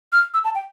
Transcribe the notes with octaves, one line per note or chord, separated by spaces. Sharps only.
F6
E6
A5
G5